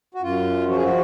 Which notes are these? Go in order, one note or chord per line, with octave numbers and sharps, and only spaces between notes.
F#4
F#2 F4
F3 F#4
G#4
F#4